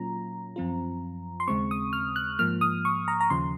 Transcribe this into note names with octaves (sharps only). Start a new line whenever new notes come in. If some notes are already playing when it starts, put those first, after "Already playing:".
Already playing: A#2 F#3 A#3 C#4 F4 A#5
F#2 F3 C4 F4
C6
D#2 C#3 G#3 C4 C#6
D#6
F6
F#6
G#2 F3 A#3 F6
D#6
C#6
A#5
A#5
D#2 C#3 F3 C6